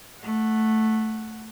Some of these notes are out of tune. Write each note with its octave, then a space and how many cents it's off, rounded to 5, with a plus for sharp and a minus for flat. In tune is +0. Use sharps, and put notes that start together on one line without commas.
A3 +0 F#5 +0